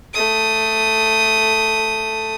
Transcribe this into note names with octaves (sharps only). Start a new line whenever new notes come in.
A3 D#6